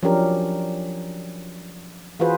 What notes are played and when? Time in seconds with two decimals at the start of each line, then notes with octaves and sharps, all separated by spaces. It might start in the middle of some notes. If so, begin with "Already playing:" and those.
0.03 F3 F#3 C#4 D4 G4 A#4
2.19 E3 F4 F#4 G#4 B4 C5